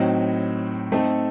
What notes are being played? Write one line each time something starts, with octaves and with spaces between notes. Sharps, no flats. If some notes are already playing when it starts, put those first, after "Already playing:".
Already playing: A2 F#3 C4 D#4
A3 C4 D#4 A4